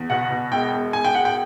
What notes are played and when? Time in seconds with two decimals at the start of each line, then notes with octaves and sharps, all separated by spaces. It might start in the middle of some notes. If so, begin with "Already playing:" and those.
Already playing: E2
0.10 B2 F#5
0.30 B2
0.52 E1 G5
0.73 E1
0.93 E1 G#5
1.05 G5
1.14 E1 F#5
1.25 G5